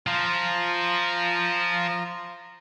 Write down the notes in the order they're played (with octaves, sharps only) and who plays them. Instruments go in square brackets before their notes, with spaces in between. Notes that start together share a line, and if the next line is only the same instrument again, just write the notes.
[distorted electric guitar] F3 [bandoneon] F4 A#5